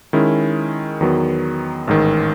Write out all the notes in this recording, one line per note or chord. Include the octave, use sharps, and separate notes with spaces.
D#3 G#3 C#4 E4
E2 D#3 F#3 B3
A1 G#2 D#3